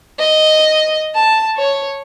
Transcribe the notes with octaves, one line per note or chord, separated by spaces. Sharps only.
D#5
A5
C#5